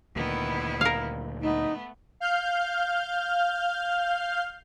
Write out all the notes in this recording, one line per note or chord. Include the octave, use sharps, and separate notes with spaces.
D2 A#2 D#3 B3 E4
A#4 F5
A3 B3 D#4
F5 F6 G6